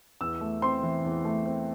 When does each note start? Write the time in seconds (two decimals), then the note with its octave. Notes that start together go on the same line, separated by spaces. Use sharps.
0.21 E2 E6
0.41 A3
0.62 C4 C6
0.83 E3
1.05 E2
1.25 A3
1.46 C4